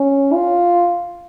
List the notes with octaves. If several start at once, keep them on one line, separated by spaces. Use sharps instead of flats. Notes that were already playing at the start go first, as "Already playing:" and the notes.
Already playing: C#4
F4